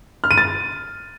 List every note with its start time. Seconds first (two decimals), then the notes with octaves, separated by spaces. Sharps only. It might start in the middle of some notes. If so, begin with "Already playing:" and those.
0.24 F6
0.31 D#7
0.38 A6